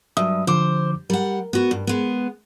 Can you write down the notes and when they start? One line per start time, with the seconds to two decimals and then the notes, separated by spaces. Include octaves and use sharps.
0.17 G2 F#3 E5 D#6
0.47 D3 F3 C5 D6
1.10 G3 A#4 F#5
1.53 B3 F#4
1.71 G2
1.87 G#3 B3